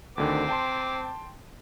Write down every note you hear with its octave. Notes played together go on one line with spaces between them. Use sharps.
D2 D3 D#3 C4 D6
G5 A5 C6